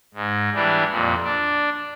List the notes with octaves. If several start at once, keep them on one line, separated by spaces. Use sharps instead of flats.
G#2
E3 G3 D4
F2 A#2
D4